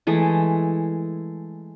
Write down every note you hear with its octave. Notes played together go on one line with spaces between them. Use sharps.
E3 G#3 A3